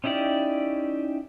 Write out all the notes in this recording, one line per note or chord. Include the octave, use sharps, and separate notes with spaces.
C#4 D#4 E4 G4 D5